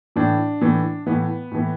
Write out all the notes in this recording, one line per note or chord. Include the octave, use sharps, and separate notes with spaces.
A2 E3 D4
A2 E3
A2 E3 B3
A2 E3